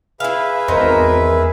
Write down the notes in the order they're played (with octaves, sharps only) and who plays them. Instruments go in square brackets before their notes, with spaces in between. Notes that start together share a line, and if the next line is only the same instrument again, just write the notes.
[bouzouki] E4 F5 [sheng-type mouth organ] G#4 B4 E5
[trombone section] G#1 A#4 [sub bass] E2 [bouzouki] C#4 D#4 C5